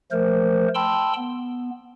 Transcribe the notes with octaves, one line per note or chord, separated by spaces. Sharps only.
F3 A3 A#4 C5
G5 A5 B5 C6 E6
B3